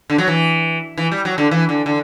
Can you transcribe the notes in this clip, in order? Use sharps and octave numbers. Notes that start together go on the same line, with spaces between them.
D3
F#3
E3
E3
G3
F#3
D3
E3
D3
D3